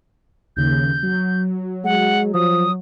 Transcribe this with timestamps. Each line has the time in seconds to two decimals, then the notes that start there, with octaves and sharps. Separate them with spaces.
0.57 D#2 C#3 G6
1.03 F#3
1.84 G#3 F#5
2.34 F3 D#6